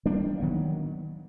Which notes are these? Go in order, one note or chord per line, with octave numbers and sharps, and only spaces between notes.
E3 G3 A#3 D4
D#3 F#3 B3